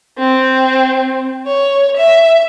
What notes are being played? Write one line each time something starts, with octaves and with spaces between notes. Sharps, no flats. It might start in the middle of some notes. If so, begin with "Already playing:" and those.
C4
C#5
E5